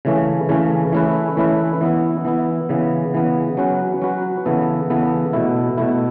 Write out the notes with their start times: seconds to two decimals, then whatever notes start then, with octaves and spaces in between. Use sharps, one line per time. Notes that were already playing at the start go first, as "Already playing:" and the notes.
0.05 C#3 E3 A3 C#4
0.49 C#3 E3 A3 C#4
0.93 E3 A3 C#4 E4 B4
1.37 E3 A3 C#4 E4 B4
1.81 E3 B3 E4
2.25 E3 B3 E4
2.69 C#3 E3 B3
3.14 C#3 E3 B3
3.57 F#3 C#4 F#4 B4
4.02 F#3 C#4 F#4 B4
4.45 C#3 E3 B3 A4
4.90 C#3 E3 B3 A4
5.33 B2 A3 E4
5.78 B2 A3 E4